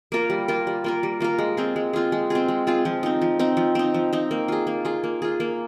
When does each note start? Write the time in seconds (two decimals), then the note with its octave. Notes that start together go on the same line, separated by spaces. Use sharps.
0.12 A#3 F4 A#4
0.30 G3
0.48 A#3 F4 A#4
0.67 G3
0.84 A#3 F4 A#4
1.03 G3
1.20 A#3 F4 A#4
1.38 G#3
1.57 C4 F4 G#4
1.76 G#3
1.93 C4 F4 G#4
2.12 G#3
2.30 C4 F4 G#4
2.48 G#3
2.67 C4 F4 G#4
2.85 F3
3.03 C4 D#4
3.22 F3
3.39 C4 D#4
3.57 F3
3.75 C4 D#4
3.94 F3
4.13 C4 D#4
4.31 A#3
4.48 F4 G#4
4.67 A#3
4.85 F4 G#4
5.04 A#3
5.22 F4 G#4
5.40 A#3